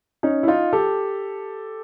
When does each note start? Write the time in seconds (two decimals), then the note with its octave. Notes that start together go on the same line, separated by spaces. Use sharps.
0.23 C#4 D#4
0.43 E4
0.48 D#4 F4
0.73 G4 A4